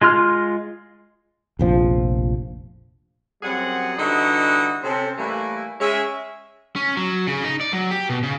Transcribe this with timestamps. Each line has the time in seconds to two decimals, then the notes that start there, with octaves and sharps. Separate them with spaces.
0.02 G#3 F4 C6 F6
1.59 F1 A#1 F3
3.43 F#2 G3 C4 G#4 F#5
3.99 D3 E3 G3 D#4 F#4 D#5
4.84 C3 C#4 A4 C5
5.18 E3 G3 A3 A#3 E4
5.80 G#3 C#4 E5
6.76 C#4
6.97 F#3
7.27 C#3
7.44 D#4
7.61 D5
7.73 F#3
7.91 G4
8.09 B2
8.23 C#3